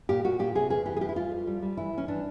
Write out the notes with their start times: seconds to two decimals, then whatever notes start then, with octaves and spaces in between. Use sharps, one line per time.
0.09 A#2 G4
0.24 A#2 F#4
0.39 A#2 G4
0.55 C3 G#4
0.70 E2 G#4
0.86 E3 G4
0.97 G#4
1.01 E2 G4
1.09 E4
1.16 G3 F4
1.32 F2
1.47 G3
1.62 G3
1.77 E3 E4
1.93 E3 C#4
2.08 E3 D4